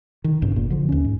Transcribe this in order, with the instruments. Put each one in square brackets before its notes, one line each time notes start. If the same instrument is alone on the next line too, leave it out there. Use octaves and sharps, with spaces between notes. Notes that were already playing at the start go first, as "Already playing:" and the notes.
[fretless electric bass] D#3
B1 G2 A#2 C#3
F#1 A#2
D3 F3
D#2 C#4
G#2